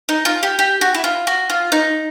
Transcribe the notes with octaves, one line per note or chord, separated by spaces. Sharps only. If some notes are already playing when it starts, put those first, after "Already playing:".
D#4
F4
G4
G4
F#4
E4
F4
F#4
F4
D#4